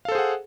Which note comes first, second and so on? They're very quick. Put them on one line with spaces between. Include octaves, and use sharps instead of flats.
F5 A4 C5 G#4 F#5